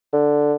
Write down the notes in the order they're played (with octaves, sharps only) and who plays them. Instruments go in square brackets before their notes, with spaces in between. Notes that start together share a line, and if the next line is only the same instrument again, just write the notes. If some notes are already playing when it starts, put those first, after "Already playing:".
[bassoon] D3